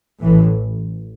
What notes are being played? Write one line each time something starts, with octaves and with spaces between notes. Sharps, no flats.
A1 A2 E3